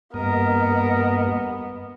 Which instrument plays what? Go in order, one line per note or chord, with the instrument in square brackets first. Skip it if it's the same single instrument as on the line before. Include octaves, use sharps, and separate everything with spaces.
[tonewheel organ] G2 A#3 D#5 [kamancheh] B3 [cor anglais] A#4